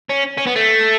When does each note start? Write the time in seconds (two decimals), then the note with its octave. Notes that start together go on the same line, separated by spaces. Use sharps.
0.09 C#4
0.37 C#4
0.46 B3
0.56 A3